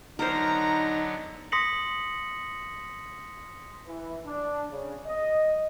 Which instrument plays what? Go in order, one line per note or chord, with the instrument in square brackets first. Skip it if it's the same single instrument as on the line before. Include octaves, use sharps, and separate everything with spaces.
[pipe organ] D3 F#3 B3 [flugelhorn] D#4 [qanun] A#4 C5 [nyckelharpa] A#5
[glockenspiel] C6 D#6 A#6 B6 C#7 F#7
[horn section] E3
D4
C#3
D#5